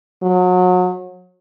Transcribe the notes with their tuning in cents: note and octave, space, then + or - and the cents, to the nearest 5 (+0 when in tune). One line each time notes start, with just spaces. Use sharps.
F#3 -30